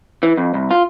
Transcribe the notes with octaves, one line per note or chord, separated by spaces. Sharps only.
E3
F2
C2
F4